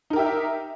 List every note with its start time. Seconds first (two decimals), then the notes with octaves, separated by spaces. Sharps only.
0.10 D#4
0.13 A#4
0.16 G4
0.19 E5